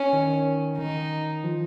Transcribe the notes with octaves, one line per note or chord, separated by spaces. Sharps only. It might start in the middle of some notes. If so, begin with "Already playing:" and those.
Already playing: C#4
D#3
D#3 D#4
F3